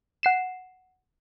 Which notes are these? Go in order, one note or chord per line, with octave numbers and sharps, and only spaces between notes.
F#5 C7 E7